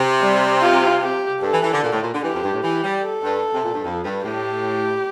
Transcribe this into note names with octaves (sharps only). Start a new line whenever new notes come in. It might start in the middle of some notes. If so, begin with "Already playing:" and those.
Already playing: C3
G3
F4
G4
G2 A4
E3
E3
D3
A#2
A2
A#2
D3
E3 G4
F2
G2
A2
E3 G4
G3
A4
G2
C3
A#2
G2
F2
G2
A2 G4